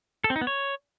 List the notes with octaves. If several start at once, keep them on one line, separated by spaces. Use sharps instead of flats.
A4
C4
D#4
B3
C#5